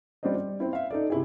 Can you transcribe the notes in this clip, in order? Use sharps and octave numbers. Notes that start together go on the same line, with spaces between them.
G3 C4 D4 C5 D#5
G3
C4 E4
E5 F5
D#4 A4 D5
C3 E4 G#4